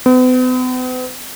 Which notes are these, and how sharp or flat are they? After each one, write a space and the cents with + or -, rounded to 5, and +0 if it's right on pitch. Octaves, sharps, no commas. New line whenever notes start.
B3 +45